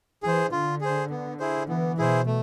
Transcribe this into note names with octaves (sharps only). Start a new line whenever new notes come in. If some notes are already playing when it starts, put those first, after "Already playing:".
E3 G#4 C5
D3 F4
G#4 C5
B3
E4 G#4 C5
E3 B3
B2 E4 G#4 C5
A3